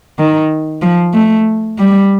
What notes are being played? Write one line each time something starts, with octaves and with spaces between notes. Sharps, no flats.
D#3
F3
A3
G3